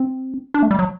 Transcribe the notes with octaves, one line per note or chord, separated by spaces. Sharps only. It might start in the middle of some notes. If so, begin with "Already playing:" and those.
Already playing: C4
D4
A3
G3
F#3